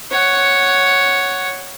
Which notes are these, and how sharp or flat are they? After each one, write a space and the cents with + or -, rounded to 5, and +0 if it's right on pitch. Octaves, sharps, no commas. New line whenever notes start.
C#5 +0 F#5 +0